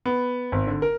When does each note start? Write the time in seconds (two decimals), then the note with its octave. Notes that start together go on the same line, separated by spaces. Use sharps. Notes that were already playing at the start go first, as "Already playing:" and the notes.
0.06 B3
0.52 G#1
0.67 D3
0.82 A#4